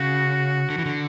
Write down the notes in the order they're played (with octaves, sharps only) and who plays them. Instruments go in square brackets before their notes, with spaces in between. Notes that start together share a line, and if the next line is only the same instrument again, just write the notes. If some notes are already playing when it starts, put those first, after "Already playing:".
Already playing: [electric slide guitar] C#3 [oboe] F#4
[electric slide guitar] D3
E3
D3